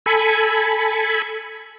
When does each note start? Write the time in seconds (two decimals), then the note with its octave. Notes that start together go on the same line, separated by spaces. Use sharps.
0.06 A4 G#5 B5